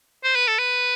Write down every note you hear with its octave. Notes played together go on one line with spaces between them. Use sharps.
C5
B4
A4
B4